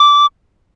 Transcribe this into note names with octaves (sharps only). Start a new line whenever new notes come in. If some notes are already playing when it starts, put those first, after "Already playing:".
Already playing: D6